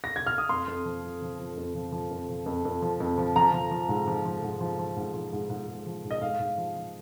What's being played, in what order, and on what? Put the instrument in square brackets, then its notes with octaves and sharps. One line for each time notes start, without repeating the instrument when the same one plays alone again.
[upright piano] A#6
G#6
F6
D#6
F2 C6
F2
F3
F3
F3
F3
F2
F3
F3
F2
F3
F2
F2
F3
F2
F3
F3 A#5
F3
F3
G#2
F3
F3
G#2
F3
F3
G#2
F3
G#2
G#2
G#2
F3
G#2
D#5
G#2 F5
G#2
F3
F3